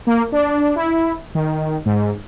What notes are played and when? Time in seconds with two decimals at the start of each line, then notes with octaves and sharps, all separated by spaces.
0.07 A#3
0.32 D4
0.76 E4
1.35 D#3
1.86 G#2